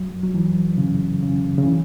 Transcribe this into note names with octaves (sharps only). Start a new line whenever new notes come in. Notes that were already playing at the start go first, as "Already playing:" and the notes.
Already playing: F#3
F#3
E3
C#3
C#3
C#3
E3